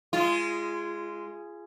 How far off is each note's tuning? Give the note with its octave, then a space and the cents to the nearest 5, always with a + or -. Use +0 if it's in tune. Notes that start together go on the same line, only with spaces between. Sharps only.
G#3 +0 F4 -30